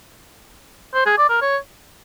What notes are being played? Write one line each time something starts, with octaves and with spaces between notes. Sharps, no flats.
C5
G#4
D5
A#4
C#5